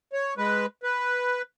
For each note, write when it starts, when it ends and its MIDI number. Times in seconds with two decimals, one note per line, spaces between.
0.13 0.34 73
0.38 0.66 56
0.38 0.66 71
0.83 1.42 71